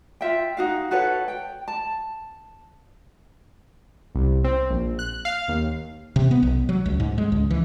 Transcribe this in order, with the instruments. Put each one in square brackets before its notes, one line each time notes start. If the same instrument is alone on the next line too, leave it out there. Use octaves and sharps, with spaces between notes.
[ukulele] F4 E5 G5
D#4 F#4 F5
F#4 A4 B4 C#5
G5
A5
[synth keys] C2
C4
A#1
F#6
F5
D#2
[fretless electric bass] C3
B3
B1
F#3
C#2
G#2
G#3
C#2
E3